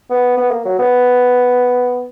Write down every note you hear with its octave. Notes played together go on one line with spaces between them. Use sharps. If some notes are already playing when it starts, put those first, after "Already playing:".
B3
B3
A#3
F#3
B3